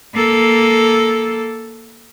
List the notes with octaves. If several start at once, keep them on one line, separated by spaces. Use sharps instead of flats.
A#3 A4